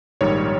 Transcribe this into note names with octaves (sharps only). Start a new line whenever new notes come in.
A#1 G#2 D#3 G3 C#5